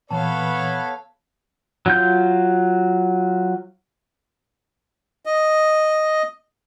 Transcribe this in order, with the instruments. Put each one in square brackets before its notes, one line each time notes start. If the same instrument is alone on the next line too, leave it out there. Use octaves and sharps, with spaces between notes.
[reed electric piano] A#2 E3 [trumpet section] B3 B4 C#5 [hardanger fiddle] A4 F5 [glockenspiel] A5
[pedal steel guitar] F#3 F4 G6
[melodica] D#5